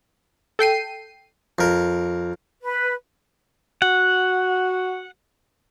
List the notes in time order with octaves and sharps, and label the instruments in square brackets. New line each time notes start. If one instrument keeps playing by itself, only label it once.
[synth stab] A4 G5 C7 D#7
[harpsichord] F2 A#4
[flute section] B4
[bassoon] F#4 [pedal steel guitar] F#5